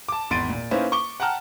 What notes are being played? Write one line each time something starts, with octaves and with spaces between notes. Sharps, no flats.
A5 D6
G#1 E2 C6 A6 D7 D#7
A#2
A#3 C#4 D#4 E4 B4 C5
C#6 D6 G7
F#5 G5 A5 A#5 F6